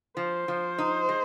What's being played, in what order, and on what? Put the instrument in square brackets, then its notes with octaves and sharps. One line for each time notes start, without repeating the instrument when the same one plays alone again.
[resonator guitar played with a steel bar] F3 [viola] C5
[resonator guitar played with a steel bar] F3
D#4
G#3